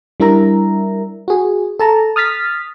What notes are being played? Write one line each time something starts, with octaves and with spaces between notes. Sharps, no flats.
G3 D4 E4 A#4 E5 A#5
F#4 G#4
A4 A5 A#5
D#6 F6 A6 B6